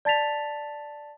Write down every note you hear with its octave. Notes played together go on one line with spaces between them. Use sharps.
D5 A5 A6 B6 F7